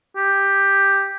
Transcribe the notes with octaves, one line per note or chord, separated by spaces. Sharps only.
G4